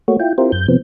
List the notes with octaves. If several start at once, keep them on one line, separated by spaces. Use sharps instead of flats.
A3 A#3 F#4 C#5
E4 F4 G5
C4 E4 F4 G4 A#4 C5
F#2 G6
C3 F3 B3 C4